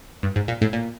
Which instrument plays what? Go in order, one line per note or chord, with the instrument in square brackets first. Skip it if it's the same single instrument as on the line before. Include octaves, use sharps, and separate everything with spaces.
[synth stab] G2
G#2
A#2
A2
A#2